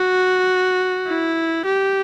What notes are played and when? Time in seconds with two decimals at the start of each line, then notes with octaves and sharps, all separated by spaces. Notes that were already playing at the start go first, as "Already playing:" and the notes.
Already playing: F#4
1.07 E4
1.65 G4